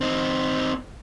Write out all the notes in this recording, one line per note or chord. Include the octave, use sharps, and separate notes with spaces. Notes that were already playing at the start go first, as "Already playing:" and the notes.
C4 D#4